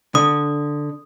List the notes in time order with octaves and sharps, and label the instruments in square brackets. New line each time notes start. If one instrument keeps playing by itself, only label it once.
[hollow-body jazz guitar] D3 [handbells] D#6